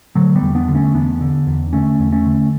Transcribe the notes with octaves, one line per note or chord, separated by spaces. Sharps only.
D3 F#3 A3
G3 B3
E2
B3 D4
D3
A3 C#4
E2 B3 D4
D3
E2
D3 A3 C#4
E2
A3 C#4
D3